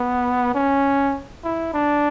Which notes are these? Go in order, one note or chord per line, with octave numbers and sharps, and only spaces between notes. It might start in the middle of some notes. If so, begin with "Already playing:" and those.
Already playing: B3
C#4
E4
D4